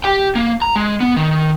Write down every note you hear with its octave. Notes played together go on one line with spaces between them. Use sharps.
G4 G5
A#3
A#5
G#3
B3
D#3